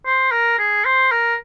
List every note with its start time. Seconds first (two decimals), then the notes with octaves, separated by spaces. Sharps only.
0.06 C5
0.31 A#4
0.59 G#4
0.85 C5
1.11 A#4